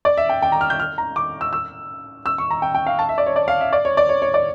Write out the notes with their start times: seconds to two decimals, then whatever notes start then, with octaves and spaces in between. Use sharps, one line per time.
0.05 D5
0.17 E5
0.29 G5
0.42 G5
0.52 A#5
0.61 F6
0.70 G6
0.80 F6
0.98 A#5
1.16 D6
1.41 E6
1.53 E6
2.26 E6
2.38 C#6
2.51 A#5
2.62 G5
2.75 G5
2.87 F5
2.99 A5
3.09 E5
3.18 D5
3.26 C#5
3.36 D5
3.48 F5
3.61 E5
3.73 D5
3.85 C#5
3.97 D5
4.09 C#5
4.22 C#5
4.34 D5